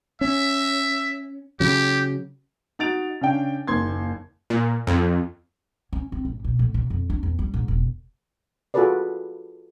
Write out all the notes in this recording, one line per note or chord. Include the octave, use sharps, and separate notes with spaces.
C#4 E5
C#3 F#3 G4
D#4 F#4 A6 D7 F7
C#3 C#4 D4 G5
F#1 D#2 C6 G#6
A#2
F2
C#4
C4
G#1
B2
A2
C3
F2
D4
E2
G3
G#2
E1
F4 F#4 G#4 A4 B4 D5